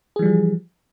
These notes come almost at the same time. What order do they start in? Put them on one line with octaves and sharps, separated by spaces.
G#4 E3 G3 F3